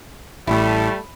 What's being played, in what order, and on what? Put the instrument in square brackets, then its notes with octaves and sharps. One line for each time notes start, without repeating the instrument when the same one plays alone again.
[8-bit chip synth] A1 A2 [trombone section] G3 A3 [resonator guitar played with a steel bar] E4